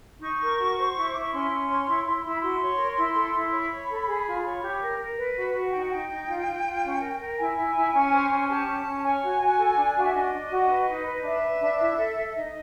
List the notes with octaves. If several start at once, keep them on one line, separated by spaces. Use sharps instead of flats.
D#4 C#6
A#4
F#4
C5
E4
E4 D6
C#6
C#4 C6
C#4
C#5
E4
E4
E4
B5
F#4 C6
C#5
A#4
E4
A4
E4
C#5 B5
C#5
A4
G#4
F4
C#5
G4
A#4
A#4
B4
F#4
F#4
D#4 G5
F#5
D#4 G5
D#4
F4
F4
F4
C#4
A#4
A#4
E4 G#5
E4
E4
C#4
C5
C#4
G#5
G4 A5
C#4
C#4
C#5 G#5
F#4
F#4
A4
D4
F#4 F5
E5
D4 D#5
D4
F#4
B4
D#4
B4
D4 E5
B4
D4
E4
A4
A4
D#4 D#5